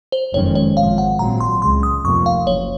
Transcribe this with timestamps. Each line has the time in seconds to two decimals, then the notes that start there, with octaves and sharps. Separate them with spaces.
0.12 C5
0.34 F#1 F2 D#3 G#3 C#4 C#5
0.55 C#5
0.77 G#1 G#2 F3 F5
0.98 F#5
1.19 A#1 A#2 F#3 C4 A#5
1.40 C6
1.62 C#2 C#3 G#3 C6
1.83 D#6
2.05 F1 F2 C3 F3 A#3 C#6
2.26 F5
2.47 F#1 C#5